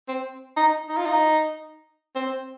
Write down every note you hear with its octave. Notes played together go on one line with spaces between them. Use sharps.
C4
D#4
D#4
F4
D#4
C4